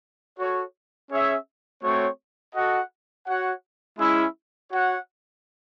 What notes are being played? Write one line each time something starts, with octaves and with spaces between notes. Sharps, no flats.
F#4 A4 C#5
C#4 G#4 C#5 E5
A3 C4 F#4 C#5
F#4 A4 D#5 F#5
F#4 C#5 F#5
G#3 C#4 E4
F#4 C#5 F#5